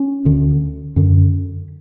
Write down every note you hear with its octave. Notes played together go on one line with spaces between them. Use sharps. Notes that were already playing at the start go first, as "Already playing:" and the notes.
Already playing: C#4
D2 D3
F#2 D3